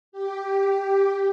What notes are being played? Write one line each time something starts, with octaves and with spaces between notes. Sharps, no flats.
G4